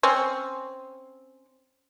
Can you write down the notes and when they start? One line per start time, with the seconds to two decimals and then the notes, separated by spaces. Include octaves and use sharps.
0.03 C4 C#4